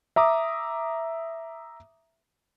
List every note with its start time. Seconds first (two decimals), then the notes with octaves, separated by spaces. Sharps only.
0.16 E5 A#5 D6 D#6